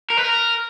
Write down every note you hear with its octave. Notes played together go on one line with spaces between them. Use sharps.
A#4
B4
A#4